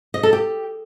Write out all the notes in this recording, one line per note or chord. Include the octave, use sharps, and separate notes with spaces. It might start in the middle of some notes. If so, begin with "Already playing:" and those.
D#5
A4
G4